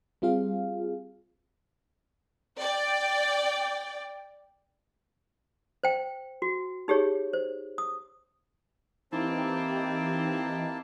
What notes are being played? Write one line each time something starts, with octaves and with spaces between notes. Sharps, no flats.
G3 C4 F4 G#4 F5
D5 G5
C5 G5
F#4
D#4 G4 G#4 C#5
C5
D#6
E3 A#3 C4 D#4 E4 G4 A5